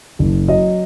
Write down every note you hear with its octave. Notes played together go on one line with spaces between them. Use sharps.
F#1
F#3 D#5